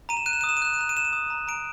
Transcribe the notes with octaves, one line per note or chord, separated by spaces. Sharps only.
A#5 D#7
E7
F#6 D#7
E7
D#6 D#7
E7
D#7
F#6 E7
D#7
A#5 E7
D#7
D#6 E7
D#7
D#6
A#5
A#5 D7